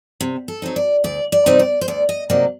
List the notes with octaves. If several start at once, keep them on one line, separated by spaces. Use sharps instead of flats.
C3
A4
F#3 C4 D#4
D5
D2 D5
D5
C3 G3 C4 D#4
D5
C5
D2 D5
D#5
C3 F#3 A#3 D#4 D5